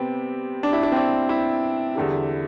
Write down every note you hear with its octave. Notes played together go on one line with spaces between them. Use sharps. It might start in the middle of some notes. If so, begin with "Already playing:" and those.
Already playing: C3 G3 B3 C4
D4
E4
D4
C4
D4
E4
E2 D3 G3